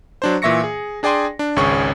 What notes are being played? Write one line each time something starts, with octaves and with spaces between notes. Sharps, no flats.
F#3 D4 C5
A#2 E3 E5 C#6 A#6 C#7
G#4
D4 G#4 D5 G5 G#5 C6
D4
G#1 C#2 C#4 G#4 C#6